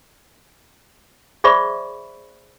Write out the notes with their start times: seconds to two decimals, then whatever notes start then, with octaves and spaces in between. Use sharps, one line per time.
1.44 G#4 C5 D5 E5 B5 C#6